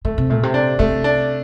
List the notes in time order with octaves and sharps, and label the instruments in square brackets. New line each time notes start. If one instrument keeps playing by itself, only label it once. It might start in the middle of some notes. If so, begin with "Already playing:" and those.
[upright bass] D3 [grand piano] A3
[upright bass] C3
[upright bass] A#2 [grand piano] A3
[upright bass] C3
[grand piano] D4
[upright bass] C3 [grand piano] A3
[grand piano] D4